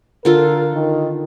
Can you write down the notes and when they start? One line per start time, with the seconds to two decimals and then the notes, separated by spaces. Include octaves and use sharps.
0.25 D3 F4 A4 A#4
0.74 D#3